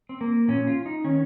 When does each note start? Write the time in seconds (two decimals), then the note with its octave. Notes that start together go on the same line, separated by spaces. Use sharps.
0.09 C4
0.21 A#3
0.48 A#2 F3 C#4
0.67 F4
0.86 D#4
1.05 D#3 C#4